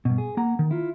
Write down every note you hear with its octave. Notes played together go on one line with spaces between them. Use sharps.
G2 B2
G#4
A#3 F#5 A#5
D#3
E4 F4